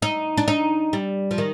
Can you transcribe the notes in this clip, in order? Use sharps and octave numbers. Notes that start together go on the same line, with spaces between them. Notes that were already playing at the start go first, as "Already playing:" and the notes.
D#4
D4
D#4
G3
F3
D#3